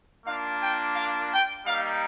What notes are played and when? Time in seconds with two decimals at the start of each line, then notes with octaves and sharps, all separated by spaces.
0.26 A#3 D4 F4 F5
0.61 G5
0.95 F5
1.30 G5
1.65 G3 A#3 D#4 F5